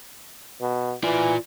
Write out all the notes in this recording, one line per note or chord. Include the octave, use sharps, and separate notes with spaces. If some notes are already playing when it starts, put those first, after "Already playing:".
B2
E3 F4 D5